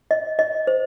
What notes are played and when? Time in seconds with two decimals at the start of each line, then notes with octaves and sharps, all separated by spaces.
0.11 D#5
0.39 D#5
0.67 C5